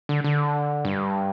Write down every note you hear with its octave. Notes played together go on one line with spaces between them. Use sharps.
D3
D3
G2